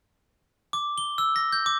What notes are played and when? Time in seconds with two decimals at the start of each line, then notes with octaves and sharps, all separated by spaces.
0.73 D6
0.98 G7
1.18 E6
1.36 A#6
1.53 G6
1.66 D6